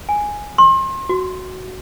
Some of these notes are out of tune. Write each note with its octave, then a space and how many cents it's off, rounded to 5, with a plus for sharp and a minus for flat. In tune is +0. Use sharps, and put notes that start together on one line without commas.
G#5 -5
C6 +35
F#4 +0